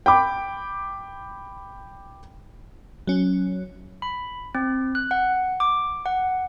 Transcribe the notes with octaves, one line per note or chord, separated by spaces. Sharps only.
G5 B5 D6
F#3 C#4
B5
C4
F#6
F#5
D6
F#5